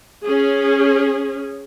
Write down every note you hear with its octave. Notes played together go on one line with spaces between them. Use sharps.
C#4 G#4